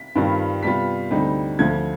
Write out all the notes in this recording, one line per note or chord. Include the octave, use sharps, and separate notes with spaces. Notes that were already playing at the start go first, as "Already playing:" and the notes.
Already playing: B6
G2 D#3 G3 C4 F4
C3 G3 B3 F4 B6
D2 D3 G3 C4 D#4
D2 D3 F3 G#6